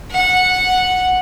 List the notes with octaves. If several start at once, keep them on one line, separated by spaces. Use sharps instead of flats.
F#5